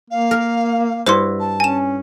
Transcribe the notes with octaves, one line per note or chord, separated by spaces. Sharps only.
A#3 F5
A#4
G2 E4 F#4 C5 C6
A5
C#4 G#5 E7